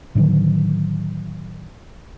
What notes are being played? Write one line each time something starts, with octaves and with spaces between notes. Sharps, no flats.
A2 D3 D#3 F#3